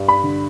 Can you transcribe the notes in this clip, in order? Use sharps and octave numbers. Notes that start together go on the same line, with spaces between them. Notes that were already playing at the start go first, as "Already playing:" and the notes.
Already playing: G2
B5
D3